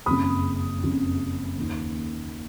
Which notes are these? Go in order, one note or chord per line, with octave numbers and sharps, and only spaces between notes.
F#1 F2 C#3 B5 D#6
F#1 F2 C#3
D#2 D#3